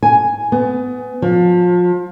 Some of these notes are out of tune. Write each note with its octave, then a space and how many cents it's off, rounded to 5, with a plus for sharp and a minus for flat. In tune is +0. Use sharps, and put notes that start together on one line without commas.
G#5 +5
B3 +30
F3 +25